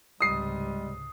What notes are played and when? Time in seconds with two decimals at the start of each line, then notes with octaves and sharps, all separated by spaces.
0.20 C#2 G#2 C3 G3 G#3 D#6 C7